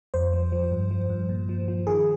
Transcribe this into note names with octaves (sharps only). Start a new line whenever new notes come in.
F2 C5
F3
F3
G2
F3
G2
A#2
F3
F3
D#3 G#4